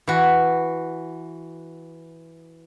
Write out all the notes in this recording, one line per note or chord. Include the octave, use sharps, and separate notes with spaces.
E3 F#4